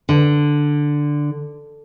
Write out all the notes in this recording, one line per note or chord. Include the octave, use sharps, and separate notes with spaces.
D3